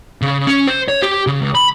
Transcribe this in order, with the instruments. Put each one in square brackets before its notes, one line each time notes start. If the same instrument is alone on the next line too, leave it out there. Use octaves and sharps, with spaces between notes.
[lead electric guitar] C#3
C#4
C5
C#5
G4
C#3
C#2
B5